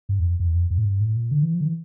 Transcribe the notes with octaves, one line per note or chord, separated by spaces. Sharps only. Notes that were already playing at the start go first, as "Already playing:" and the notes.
G2
E2
F2
F2
E2
F2
F2
A2
G2
A2
A#2
D3
E3
F3
D3
E3